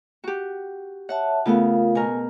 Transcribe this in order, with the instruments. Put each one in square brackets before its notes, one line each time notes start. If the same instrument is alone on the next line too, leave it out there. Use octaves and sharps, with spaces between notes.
[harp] F#4 G4
[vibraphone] C#5 E5 A5 [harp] F#5
[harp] C#3 A3 B3 [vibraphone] F4 A#4 F5
[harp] B2 A#4 [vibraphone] G#5